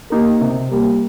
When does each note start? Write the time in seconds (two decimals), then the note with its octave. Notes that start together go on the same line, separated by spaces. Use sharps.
0.10 A#3 D#4 G4 A#4
0.41 C3
0.71 G3 A#3